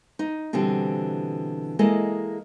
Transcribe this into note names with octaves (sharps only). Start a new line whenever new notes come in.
D#4
B2 D3 E3 G3 C4
G#3 A#3 E4 A4 D#5